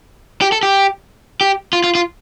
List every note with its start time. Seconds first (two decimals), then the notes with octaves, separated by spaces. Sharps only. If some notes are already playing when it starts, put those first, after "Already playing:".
0.42 G4
0.52 A4
0.63 G4
1.41 G4
1.73 F4
1.84 F4
1.95 F4